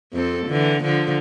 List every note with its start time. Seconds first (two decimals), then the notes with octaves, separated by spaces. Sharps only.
0.13 F2 C4 A4
0.47 D3 E3
0.83 D3 F3